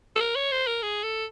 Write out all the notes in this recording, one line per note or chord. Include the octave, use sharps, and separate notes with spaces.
A4
A#4
C#5
C5
A#4
G#4
A4